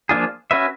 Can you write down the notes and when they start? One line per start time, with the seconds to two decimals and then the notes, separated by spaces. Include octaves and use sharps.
0.09 F3 A#3 D4 F4 G#4
0.51 C#4 F#4 B4 E5